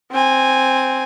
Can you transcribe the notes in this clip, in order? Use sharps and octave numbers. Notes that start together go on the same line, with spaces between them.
C4 G#5